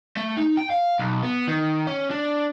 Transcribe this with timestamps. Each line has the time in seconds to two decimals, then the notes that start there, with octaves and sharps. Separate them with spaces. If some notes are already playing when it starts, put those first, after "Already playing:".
0.17 A3
0.36 D#4
0.57 G5
0.70 F5
0.99 B1
1.23 B3
1.48 D#3
1.87 C#4
2.11 D4